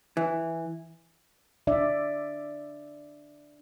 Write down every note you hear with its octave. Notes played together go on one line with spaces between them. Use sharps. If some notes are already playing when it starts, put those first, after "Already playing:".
E3
D4 D5 E5